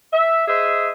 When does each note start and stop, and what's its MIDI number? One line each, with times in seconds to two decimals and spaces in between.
0.13 0.46 76
0.48 0.91 68
0.48 0.91 72
0.48 0.91 75
0.48 0.91 76